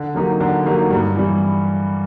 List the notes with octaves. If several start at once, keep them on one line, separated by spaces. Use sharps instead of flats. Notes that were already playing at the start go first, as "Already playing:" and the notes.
Already playing: D3
F#3 A#3 D#4 G4
D3
F#3 A#3 D#4 G4
G2
E3 G3